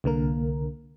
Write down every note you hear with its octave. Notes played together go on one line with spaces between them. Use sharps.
C2 D3 A#3 A#4